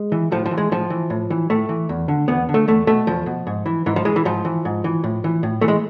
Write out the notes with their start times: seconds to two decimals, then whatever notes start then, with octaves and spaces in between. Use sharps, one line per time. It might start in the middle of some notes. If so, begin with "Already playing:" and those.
Already playing: G#3
0.12 E3
0.32 A2 F3
0.46 F3
0.51 E3
0.58 G#3
0.71 A2 F3
0.90 E3
1.10 A2
1.30 E3
1.50 A2 A3
1.69 E3
1.89 E2
2.08 D3
2.28 E2 B3
2.49 D3
2.54 A3
2.68 E2 A3
2.87 B2 A3
3.07 E2 F3
3.26 B2
3.47 G#2
3.66 E3
3.86 G#2 E3
3.96 F3
4.05 E3 G#3
4.16 E3
4.25 G#2 F3
4.45 E3
4.65 G#2
4.84 E3
5.04 A2
5.24 E3
5.43 A2
5.61 E3 A3
5.68 G#3